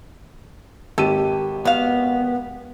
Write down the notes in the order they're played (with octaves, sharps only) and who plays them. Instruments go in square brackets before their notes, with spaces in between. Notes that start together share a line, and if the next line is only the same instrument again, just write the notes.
[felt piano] G#1 G4 D#7 [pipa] A4
[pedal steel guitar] B3 [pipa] F#4 F5